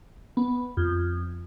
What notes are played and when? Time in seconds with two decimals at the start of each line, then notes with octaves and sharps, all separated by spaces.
0.37 B3
0.77 F2